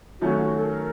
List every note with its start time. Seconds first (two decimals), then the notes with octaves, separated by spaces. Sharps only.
0.20 D#3 F#3 A3 C#4 F#4
0.42 F#4
0.57 A4
0.64 A#4